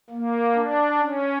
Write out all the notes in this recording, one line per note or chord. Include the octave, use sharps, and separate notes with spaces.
A#3
D4
C#4